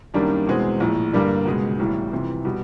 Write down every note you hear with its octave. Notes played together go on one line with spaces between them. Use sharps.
F#2 D#3 G3 A#3 D4
E2 B2 G#3 C4
A#1 A2 F3
G2 D3 G3 A#3 D4
C#2 B2 G#3
B1 A2 E3 G3
F2 C3 E3
B2 G3